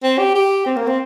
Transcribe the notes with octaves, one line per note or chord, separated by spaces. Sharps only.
C4
G4
G4
C4
A#3
C4